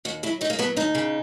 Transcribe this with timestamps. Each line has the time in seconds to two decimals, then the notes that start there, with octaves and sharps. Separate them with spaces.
0.05 D#2 F#4
0.23 F#3 E4
0.41 F#3 D#4
0.50 A#3
0.59 F#3 B3
0.76 D#2 D#4
0.95 C#3